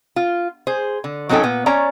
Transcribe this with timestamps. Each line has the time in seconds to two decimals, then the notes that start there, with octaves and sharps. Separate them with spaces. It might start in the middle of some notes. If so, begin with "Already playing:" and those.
0.16 F4
0.67 G#4 C5
1.04 D3
1.29 F#3 C4 C#4 D#4 A4 G5
1.43 A#2 B3
1.66 C#4 C#5 D5 A#5